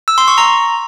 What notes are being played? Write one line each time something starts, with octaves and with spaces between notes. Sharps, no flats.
E6
C6
C#6
A#5